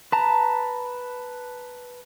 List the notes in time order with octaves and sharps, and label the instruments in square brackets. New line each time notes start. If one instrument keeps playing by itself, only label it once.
[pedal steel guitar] B4 A5 A#5